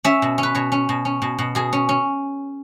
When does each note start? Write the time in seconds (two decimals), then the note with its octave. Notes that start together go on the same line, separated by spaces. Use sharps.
0.04 C#4 E5
0.22 B2
0.38 C#4
0.43 B4
0.55 B2 C#5
0.72 C#4
0.89 B2
1.05 C#4
1.22 B2
1.39 B2
1.55 B2 G#4
1.73 C#4
1.89 C#4